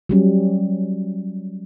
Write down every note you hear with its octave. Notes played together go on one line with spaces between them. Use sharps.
F#3 G3 C#4